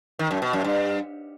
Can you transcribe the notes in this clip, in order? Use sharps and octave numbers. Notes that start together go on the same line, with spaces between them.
D#3
F#2
B2
F#2
G2